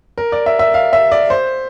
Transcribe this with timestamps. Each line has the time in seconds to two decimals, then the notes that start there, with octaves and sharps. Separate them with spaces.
0.18 A#4
0.32 D5
0.46 E5
0.59 E5
0.74 F5
0.93 E5
1.12 D5
1.30 C5